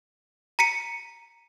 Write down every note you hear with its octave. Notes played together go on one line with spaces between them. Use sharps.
A#5 B6 C#7 D#7